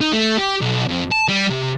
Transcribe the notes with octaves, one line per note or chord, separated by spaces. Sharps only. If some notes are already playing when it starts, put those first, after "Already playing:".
D#4
A3
G4
B1
F2
A5
G3
C3